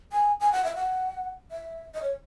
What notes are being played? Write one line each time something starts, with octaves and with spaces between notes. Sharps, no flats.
G#5
G#5
F#5
E5
F#5
E5
D#5
C#5